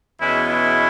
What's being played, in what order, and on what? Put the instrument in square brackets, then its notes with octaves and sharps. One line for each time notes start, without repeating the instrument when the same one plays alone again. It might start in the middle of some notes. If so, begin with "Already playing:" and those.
[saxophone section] E2 B2 G#3 C#4 [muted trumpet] E4
[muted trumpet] E4